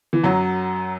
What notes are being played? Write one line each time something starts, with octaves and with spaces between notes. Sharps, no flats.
E3
F#2 F#3